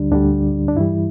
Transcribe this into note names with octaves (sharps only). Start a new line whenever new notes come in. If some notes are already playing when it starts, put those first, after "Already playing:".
Already playing: D2 D3 G3 D4
D2 D3 G3 D4
D4
G2 E3 G3 E4